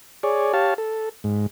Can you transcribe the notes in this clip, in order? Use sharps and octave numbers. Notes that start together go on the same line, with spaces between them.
G#4 C#5 D5
G4 C#5 F5 A5
A4
G#2